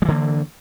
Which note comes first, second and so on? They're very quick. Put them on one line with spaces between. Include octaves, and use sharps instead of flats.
G3 E3 D3 A#3